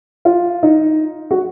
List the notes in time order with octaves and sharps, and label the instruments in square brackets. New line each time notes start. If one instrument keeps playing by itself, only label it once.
[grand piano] F4
D#4
F#4